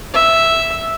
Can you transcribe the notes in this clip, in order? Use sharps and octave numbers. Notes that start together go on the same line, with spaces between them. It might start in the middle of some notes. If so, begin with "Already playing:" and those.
E5